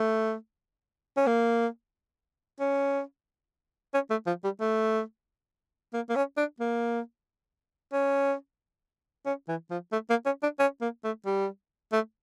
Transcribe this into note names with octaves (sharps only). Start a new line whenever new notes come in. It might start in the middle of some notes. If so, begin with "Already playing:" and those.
Already playing: A3
C#4
A#3
C#4
C#4
A3
F3
G3
A3
A#3
A#3
C#4
D4
A#3
C#4
C#4
E3
F3
A3
A#3
C#4
D4
C#4
A#3
A3
G3
A3